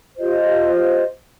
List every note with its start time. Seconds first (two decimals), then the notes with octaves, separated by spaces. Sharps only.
0.18 F4 G4 C5 D#5